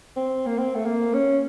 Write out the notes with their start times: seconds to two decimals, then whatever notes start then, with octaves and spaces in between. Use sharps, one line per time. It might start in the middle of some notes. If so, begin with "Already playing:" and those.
0.16 C4
0.46 A#3
0.58 C4
0.75 A3
0.86 A#3
1.14 C#4